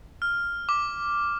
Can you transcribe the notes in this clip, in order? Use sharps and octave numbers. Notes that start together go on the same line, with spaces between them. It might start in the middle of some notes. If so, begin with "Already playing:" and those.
F6
D6